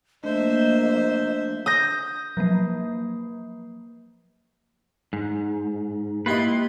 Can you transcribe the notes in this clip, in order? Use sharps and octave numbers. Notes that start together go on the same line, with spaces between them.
F3 A3 A#3 D4 C5 D#5 E5
D#6 G6 A#6
F3 F#3 A#3
G#2
A#3 E4 F4 G4 B4 D#5